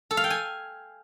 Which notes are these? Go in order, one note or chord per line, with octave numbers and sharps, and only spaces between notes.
A4
F5
G5
G#5